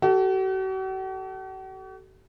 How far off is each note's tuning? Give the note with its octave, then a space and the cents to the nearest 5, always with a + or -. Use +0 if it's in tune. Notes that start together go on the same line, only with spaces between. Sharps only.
F#4 +45 A4 -15